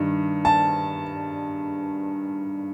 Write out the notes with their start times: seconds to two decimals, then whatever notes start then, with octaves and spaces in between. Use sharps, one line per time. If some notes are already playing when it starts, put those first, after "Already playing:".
Already playing: G2 D#3
0.45 A5